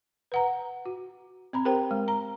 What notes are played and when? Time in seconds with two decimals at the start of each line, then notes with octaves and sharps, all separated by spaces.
0.32 B4 F#5 A#5
0.86 F#4
1.53 C4 A#5 B5
1.65 G4 A#4 C5 G5 A#5
1.91 G#3
2.08 A#5